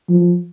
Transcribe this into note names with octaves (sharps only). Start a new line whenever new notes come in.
F3